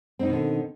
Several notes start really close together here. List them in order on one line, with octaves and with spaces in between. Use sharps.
C4 D#4 B2 D#3 D3